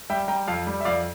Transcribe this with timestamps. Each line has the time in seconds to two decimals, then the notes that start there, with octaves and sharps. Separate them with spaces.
0.10 G3 E5 G5
0.28 G3 G5 A#5
0.48 F2 F5 A5
0.67 G3
0.81 E5
0.85 F2 D5 F5